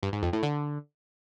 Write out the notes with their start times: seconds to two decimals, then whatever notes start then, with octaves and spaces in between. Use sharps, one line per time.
0.03 G2
0.13 G#2
0.23 F2
0.33 A2
0.43 D3